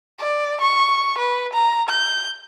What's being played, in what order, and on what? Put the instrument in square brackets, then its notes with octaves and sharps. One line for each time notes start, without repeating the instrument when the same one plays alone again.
[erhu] D5
C#6
B4
A#5
G6